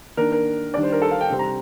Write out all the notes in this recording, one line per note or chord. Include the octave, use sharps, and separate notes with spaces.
D#3 A#3 D4 A#4
A#4
D#3 G3 D4 D5
C5
A#4
A4
F5
G5
C3 G3 C4
A#5